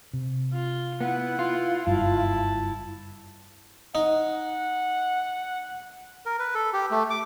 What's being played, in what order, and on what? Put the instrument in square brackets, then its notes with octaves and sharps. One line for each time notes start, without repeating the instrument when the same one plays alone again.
[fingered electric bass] C3
[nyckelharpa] F4
[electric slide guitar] B3 [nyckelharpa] E4 F#5
[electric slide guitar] F4
[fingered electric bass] F#1 G2 [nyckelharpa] E4 A5
[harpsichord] D#4 [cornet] F#5
[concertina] A#4
B4
A4
G4
A3
D6